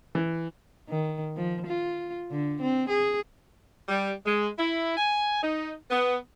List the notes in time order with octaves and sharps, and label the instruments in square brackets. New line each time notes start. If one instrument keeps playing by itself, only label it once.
[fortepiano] E3
[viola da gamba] D#3
F3
F4
D3
C4
G#4
[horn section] G3
G#3
E4
G#5
D#4
B3